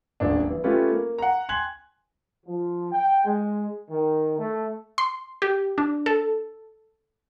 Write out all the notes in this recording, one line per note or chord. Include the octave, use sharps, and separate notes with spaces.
D#1 A1 D4
E3
A3 C#4 F4 G4 B4
A#3
F#5 A#5
G5 G#5 C6 F#6 G#6 F#7
F3
G5
G#3
D#3
A3
C6
G4
D4
A4